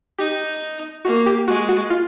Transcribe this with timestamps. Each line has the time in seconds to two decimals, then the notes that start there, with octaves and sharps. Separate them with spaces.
0.18 D#4 G4
1.05 A#3 F#4
1.26 G4
1.48 G#3 F#4
1.69 F#4
1.90 F4